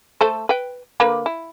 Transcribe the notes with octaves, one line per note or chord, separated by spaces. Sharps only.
A3 A4 C5
B4 G5
D3 A#3 B4
E4